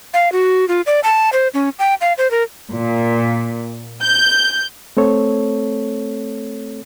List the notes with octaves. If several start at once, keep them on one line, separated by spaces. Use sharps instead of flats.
F5
F#4
F4
D5
A5
C5
C#4
G5
F5
C5
A#4
A#2
G6
A3 C4 A4 C#5